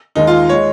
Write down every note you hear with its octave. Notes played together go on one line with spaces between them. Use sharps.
D#2 D#3 G#3 D#4
F4
G#3 C#5